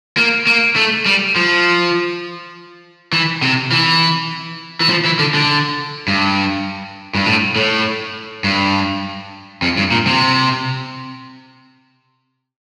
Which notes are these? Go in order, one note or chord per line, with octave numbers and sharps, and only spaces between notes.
A#3
A#3
A3
G3
F3
E3
C3
E3
E3
F3
E3
D3
D3
G2
G2
A2
A2
G2
F2
G2
A#2
C3